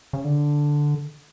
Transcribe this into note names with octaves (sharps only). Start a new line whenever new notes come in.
C#3
D3